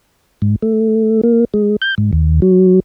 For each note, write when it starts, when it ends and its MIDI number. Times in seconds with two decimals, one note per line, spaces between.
0.42 0.56 44
0.62 1.21 57
1.23 1.45 58
1.54 1.76 56
1.82 1.95 91
1.98 2.11 44
2.13 2.40 39
2.42 2.80 54